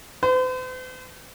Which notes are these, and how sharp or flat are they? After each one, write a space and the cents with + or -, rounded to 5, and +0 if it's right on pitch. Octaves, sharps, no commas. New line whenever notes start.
C5 -45